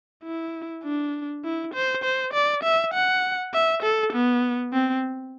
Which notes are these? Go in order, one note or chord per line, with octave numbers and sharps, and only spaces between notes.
E4
D4
E4
C5
C5
D5
E5
F#5
E5
A4
B3
C4